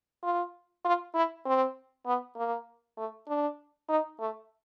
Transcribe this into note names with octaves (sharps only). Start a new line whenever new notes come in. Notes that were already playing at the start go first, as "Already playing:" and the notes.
F4
F4
E4
C4
B3
A#3
A3
D4
D#4
A3